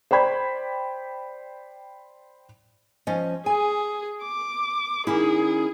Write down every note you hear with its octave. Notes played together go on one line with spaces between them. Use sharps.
C5 D5 G5 B5 G#6
F3 C#4 D#5
G#4 G#5
D6
D#3 C#4 E4 G#4